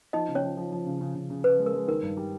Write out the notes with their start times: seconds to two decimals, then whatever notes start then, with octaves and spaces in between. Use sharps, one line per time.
0.13 F3 D#4 D#5
0.28 C#3
0.35 C#4 C#5
0.42 F3
0.57 F3
0.72 F3
0.86 C#3
1.01 C#3
1.15 C#3
1.30 C#3
1.44 C#3 B4
1.59 G#3
1.66 A#4
1.74 G#3
1.88 D#3 A#4
2.02 G2
2.17 G3